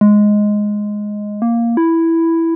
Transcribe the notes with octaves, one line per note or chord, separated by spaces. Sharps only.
G#3
A#3
E4